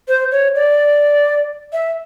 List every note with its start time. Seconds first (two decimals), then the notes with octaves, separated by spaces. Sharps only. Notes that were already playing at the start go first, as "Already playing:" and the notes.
0.08 C5
0.31 C#5
0.55 D5
1.73 E5